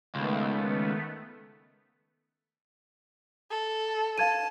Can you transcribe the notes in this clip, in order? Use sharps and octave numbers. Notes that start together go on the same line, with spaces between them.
C#2 D#3 A3 B3
A4
F5 A5 G#6 D#7